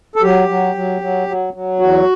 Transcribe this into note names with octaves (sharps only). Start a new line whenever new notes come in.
A4
F#3 G4
F#3
F#3
F#3
F#3
F#3
E2 F#4